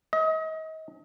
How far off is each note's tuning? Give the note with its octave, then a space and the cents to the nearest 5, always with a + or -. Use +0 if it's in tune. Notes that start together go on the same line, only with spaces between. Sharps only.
D#5 +35